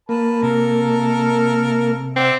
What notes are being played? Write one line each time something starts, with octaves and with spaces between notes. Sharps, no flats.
A#3 B4 A5
C3 A4 A#4
C4 D5 E5 F#5